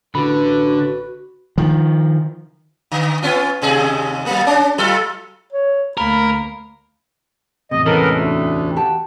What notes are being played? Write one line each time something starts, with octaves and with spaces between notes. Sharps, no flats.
A1 D3 F#4 B4 B5
D#3 F3
D3
B3 C#4 F4
D#2 C3 G#4
F#3 A#3
C#4 D4
F#3 F4 A4
C#5
D2 A#3 A#4 B5
E2 A2 C3 D#5
E3 G#3 A3 B3 C#4 A4 A#4
D2
F#4 G4 A5